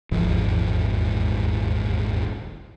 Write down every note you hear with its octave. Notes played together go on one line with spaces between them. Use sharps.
D#1 G#1 E2 F3